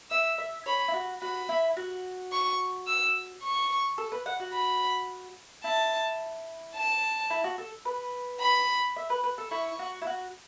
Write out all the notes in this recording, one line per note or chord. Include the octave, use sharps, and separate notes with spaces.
E5 E6
E5
C#5 B5
E4
F#4
F#4 B5
E4
F#4
C#6
E6
C#6
A4
B4
F#5
F#4
B5
E4 A5
A5
E4
F#4
A4
B4
B5
E5
B4
B4
A4
E4 C#6
F#4
E4
F#4